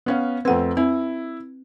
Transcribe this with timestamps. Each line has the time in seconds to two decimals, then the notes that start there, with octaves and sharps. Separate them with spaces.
0.06 B3 C#4 F5
0.45 F2 A3 C4 B4 F#5
0.77 C4 E4